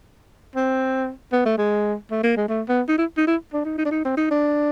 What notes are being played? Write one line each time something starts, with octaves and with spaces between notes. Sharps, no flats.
C4
B3
A3
G#3
A3
A#3
G#3
A3
B3
D#4
E4
D#4
E4
D4
D#4
D#4
D4
D#4
C4
D#4
D4